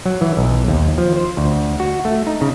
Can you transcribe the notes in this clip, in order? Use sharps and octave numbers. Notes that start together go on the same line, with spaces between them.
F#3
E3
B1
D#2
F3
C5
D2
F#4
A3
D#4
C#3